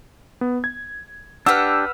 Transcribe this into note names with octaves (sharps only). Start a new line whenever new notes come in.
B3
G#6
D4 G4 B4 F#5 E6 F6